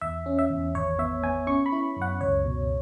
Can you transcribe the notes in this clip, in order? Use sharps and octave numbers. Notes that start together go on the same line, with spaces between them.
E2 E5
C#4
E5
E2
G#1 C#5
B3 E5
B3 G#5
C#4 C#6
B5
E4
F#2
F#5
C#2 C#5
B2